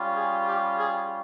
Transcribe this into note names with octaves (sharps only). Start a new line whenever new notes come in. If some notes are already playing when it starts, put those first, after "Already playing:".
Already playing: G3 C#4 F4
G#4
G4
G#4